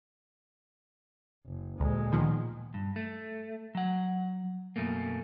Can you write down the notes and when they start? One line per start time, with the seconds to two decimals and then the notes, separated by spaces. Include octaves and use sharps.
1.46 F#1
1.80 D2 A#2 G#3
2.12 B2 D#3 F3
2.74 G2
2.96 A3
3.75 F#3 F#5
4.76 F#2 B2 A3 A#3